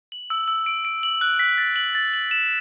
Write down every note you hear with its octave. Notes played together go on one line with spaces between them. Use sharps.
F#7
E6
E6
D7
D7
F#7
F#6
B6
A6
F#7
A6
F#7
E7